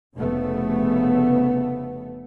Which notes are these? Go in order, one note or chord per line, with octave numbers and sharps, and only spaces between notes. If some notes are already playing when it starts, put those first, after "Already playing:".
F1 C#3 A3 B3